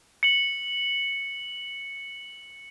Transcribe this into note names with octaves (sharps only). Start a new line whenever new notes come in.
C#7 F#7